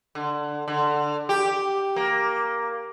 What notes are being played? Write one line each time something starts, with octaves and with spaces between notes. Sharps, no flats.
D3
D3
G4
A#3